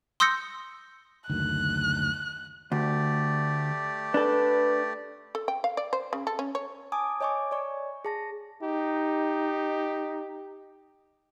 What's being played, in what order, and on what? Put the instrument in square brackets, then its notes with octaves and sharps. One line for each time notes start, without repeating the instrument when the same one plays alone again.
[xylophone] C6 D#6 E6 G6 A#6 C#7
[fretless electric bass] F#1 D2 D#3 [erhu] F#6
[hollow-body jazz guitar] D2 [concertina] A3 G4 D5
[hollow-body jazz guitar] D4 A4 [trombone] B4
[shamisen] A4
G5
F5
D5
C5
C#3
A4
C#4
C#5
[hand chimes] G#5 A5 D6 D#6
C#5 D#5 G#5 C#6 D6
C#5 D5 C#6
G#4 A5 A#6
[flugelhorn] D#4 [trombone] G4